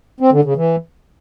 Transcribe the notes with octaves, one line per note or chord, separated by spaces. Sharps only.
C4
D3
C#3
E3